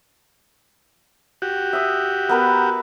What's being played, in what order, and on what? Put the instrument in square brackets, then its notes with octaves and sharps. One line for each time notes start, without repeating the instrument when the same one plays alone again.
[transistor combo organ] F#4 G4
[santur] E5 D#6
B3 A#4 B4